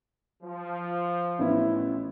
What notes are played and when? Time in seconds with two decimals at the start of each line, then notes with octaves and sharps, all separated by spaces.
0.43 F3
1.39 A1 B3 E4